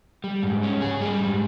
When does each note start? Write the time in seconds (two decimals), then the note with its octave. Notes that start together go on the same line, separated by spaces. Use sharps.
0.24 G3
0.43 G#2
0.63 C#4
0.82 G#4
1.01 G3
1.21 G#2